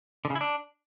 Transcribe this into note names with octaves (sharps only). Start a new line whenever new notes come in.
D3
C#3
E4
D4